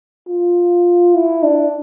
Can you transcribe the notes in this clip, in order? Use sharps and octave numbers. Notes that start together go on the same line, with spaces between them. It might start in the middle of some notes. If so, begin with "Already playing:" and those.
F4
E4
D4